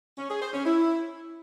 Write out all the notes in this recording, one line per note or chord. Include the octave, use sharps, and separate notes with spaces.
C#4
G#4
C5
C#4
E4